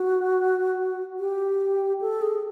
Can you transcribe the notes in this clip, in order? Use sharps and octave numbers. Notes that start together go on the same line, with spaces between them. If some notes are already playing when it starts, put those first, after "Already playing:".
Already playing: F#4
G4
A4
G#4